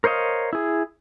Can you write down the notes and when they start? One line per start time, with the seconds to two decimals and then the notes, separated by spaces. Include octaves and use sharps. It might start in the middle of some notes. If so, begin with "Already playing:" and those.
0.04 A#4 C5 C#5 D#5 F5
0.53 E4 G#4